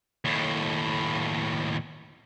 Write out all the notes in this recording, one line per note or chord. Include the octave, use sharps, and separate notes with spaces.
D#2 A2